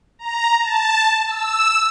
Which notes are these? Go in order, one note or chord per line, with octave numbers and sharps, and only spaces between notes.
A#5
A5
E6